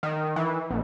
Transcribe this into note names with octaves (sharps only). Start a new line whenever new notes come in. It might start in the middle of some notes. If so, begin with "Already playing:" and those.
D#3
E3
A#1